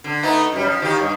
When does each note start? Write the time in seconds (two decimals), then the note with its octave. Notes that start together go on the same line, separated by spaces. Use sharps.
0.04 D3
0.23 A3 B3 D#4
0.52 F#2 G3
0.66 F3
0.80 D#2 D#3 G4
0.99 G2